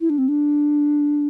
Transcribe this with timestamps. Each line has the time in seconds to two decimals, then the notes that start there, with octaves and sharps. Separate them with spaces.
0.01 E4
0.10 D4
0.18 C4
0.28 D4